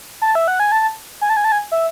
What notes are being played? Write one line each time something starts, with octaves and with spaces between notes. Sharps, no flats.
A5
E5
F#5
G#5
A5
G#5
A5
G#5
A5
G#5
E5